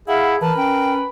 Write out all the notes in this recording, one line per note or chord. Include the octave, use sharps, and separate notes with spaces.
E4 G#4 F5 F#5
E3 A#4 B4 A5
C#4 G5